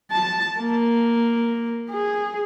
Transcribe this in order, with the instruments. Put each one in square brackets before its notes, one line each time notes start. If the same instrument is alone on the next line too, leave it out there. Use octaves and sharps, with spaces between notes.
[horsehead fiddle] A5
A#3
G#4